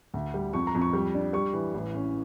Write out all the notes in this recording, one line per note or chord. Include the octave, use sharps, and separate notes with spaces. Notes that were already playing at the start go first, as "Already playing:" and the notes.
D2
G3
F2 C#6
A#5
F2
C#6
G3
D4
G3 C#6
E3
A1
C#4